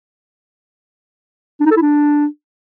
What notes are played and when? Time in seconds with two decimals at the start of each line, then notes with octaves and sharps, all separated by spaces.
1.60 D4
1.66 D#4
1.71 A4
1.76 E4
1.82 D4